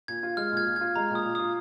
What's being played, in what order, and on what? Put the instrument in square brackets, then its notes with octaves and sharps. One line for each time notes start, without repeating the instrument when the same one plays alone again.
[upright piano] A#2 [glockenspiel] G#6
[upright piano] F4
[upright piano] G#3 [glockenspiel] F6
[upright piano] A#2
[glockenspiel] G#6
[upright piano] A#2
[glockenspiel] G#6
[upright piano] F4
[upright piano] G#3 [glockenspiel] A#5
[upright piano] A#2 [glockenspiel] D#6
[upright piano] A#2
[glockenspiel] D#6
[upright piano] F4